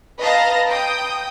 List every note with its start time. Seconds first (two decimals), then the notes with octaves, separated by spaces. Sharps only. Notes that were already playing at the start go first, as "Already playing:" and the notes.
0.20 B4 D#5 F5 A5 A#5 A#6
0.70 G5 D#6 G6